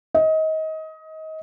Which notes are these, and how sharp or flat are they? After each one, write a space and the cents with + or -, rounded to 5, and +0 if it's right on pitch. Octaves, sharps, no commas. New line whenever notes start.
D#5 +25